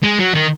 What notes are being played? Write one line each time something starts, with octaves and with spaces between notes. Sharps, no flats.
G#3
F#3
D#3